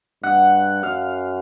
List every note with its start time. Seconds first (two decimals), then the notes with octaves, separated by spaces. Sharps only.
0.23 G2 F#5
0.83 F#2 F5